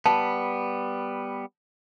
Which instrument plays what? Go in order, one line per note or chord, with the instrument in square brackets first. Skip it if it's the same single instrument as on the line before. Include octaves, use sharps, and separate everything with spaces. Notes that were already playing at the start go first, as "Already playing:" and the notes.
[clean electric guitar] G3 B3 [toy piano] A5